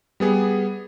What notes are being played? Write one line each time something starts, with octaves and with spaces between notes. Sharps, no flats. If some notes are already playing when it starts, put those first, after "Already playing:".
G3 B3 G#4